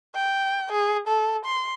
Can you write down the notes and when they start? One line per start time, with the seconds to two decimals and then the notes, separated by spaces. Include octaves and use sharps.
0.15 G5
0.72 G#4
1.07 A4
1.45 C6